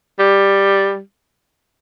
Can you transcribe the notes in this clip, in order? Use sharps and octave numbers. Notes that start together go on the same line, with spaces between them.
G3